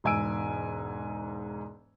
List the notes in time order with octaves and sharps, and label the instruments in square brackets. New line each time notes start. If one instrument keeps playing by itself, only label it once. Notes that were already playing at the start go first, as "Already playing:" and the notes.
[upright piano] E1 G#2 G#5 E6 D7